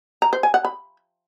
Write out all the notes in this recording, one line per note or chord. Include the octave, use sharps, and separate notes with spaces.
A#5
C5
G#5
F#5
B5